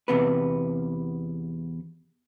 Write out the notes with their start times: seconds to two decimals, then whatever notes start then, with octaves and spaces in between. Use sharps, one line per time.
0.08 E2 C3 B3 B4